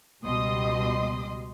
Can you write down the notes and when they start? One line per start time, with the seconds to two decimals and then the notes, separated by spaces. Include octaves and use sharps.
0.23 C#2 B2 G3 D#5 C6 D#6